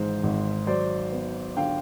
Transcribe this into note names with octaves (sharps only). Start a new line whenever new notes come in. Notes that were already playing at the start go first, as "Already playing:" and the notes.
Already playing: G#1 G#2 E3 C5
G#1
F#3 C5 D5
B3
D3 F5 G5